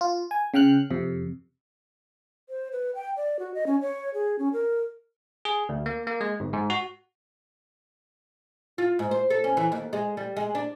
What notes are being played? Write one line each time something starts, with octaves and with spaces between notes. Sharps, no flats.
F4
G#5
C#3 G5 F6 F#6
F2 C3
C5
B4
G5
D5
F#4
D#5
C#4
C#5
G#4
C#4
A#4
G#4
D2
A#3
A#3
G#3
G1
G#2
F#4
F4
G#2
C5
A4
C#4
E3
D#2
G#3
G3
G#3
D4